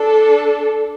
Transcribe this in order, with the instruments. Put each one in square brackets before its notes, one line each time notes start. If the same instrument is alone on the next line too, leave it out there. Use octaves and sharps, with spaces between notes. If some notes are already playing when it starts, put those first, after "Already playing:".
Already playing: [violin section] D4 A4